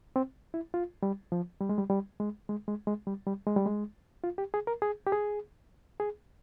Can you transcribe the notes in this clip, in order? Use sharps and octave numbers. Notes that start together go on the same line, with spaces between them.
C4
E4
F4
G3
F3
G3
G#3
G3
G3
G#3
G#3
G#3
G#3
G3
G3
G#3
G3
G#3
F4
G4
G#4
A#4
G#4
G4
G#4
G#4